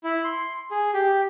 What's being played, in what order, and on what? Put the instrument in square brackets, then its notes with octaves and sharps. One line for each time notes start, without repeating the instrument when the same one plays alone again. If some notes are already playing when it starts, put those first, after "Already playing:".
[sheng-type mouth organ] E4
C6
G#4
G4